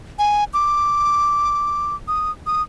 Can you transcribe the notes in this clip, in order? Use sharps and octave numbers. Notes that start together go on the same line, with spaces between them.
G#5
D6
D#6
D#6